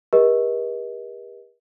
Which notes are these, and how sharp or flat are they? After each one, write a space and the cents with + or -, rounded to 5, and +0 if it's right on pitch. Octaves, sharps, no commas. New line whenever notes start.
G4 +35 A#4 +45 D#5 +30